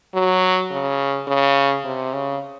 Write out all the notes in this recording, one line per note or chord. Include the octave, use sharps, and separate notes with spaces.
F#3
C#3
C#3
C3
C#3